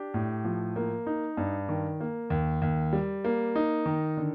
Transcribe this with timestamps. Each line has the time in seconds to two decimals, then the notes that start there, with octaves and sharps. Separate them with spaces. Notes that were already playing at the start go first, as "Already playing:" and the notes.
Already playing: D4 G4
0.14 A2
0.44 F3
0.76 A#3
1.07 D#4
1.37 G2
1.69 D#3
2.00 A#3
2.30 D#2
2.62 D#2
2.93 G3
3.25 A#3
3.56 D#4
3.86 D#3
4.17 D3